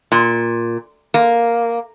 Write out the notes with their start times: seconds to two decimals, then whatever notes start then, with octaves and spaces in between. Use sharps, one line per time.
0.12 A#2
1.14 A#3